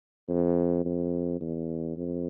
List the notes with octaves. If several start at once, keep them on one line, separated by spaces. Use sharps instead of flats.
F2
F2
E2
F2